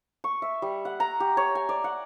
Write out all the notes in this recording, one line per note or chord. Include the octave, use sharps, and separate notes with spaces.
C#6
E5
G3
F#5
A#5
G4
C#5
G#5
D5
F#5